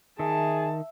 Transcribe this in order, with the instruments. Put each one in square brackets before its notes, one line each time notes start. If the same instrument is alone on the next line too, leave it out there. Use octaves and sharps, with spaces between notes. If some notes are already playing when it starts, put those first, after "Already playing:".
[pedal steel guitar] D#3 [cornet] G#4 [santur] E5 [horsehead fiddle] A5